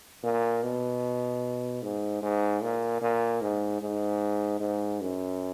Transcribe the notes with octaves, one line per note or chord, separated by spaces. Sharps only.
A#2
B2
G#2
G#2
A#2
A#2
G#2
G#2
G#2
F#2